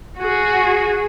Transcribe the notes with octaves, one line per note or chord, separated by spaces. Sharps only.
F#4 G#4